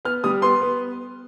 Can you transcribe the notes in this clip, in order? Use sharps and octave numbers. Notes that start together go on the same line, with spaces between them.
B3 F6
G3 D#6
B3 C6
B3